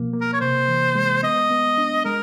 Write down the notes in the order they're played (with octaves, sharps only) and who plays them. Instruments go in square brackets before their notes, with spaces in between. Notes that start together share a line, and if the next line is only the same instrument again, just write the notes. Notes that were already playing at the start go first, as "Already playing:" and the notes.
Already playing: [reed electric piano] B2 F3 A#3
A#3
[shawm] A#4
C#5
[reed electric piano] C3 [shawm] C5
[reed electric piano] E3
G#3
[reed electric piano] B3 [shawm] D#5
[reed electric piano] B3
D4
[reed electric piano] G#3 [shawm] A#4